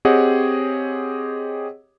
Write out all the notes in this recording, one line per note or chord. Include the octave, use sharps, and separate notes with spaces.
C4 G4 G#4 C#5 D#5 F#5